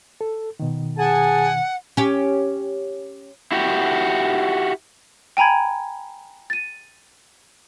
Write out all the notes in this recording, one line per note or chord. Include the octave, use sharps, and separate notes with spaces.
A4
B2 D#3
G#4 F#5 G#5 A5
C#4 G4
E4 F#4 G4
G5 G#5 A#5 B5 G#6
A6 D#7